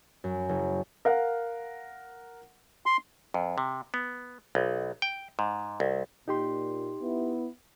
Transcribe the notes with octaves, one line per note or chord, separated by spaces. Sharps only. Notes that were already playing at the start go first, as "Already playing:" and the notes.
F#2
F#1
A#4 F5 F#5
C6
F2
C3
B3
B1
G5
G#2
C2
A#2 D#4 G4 C6
B3 E4